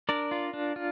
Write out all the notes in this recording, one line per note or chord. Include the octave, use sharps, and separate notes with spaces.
D4 A#4 D5
F4
D4
F4